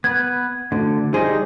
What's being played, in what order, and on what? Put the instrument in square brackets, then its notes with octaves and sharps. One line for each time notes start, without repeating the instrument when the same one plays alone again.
[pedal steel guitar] B3 B4 [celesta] G#6
[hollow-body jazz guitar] D2 [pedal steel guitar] D3
[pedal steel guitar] G3 D#4 [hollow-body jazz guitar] G#4 C5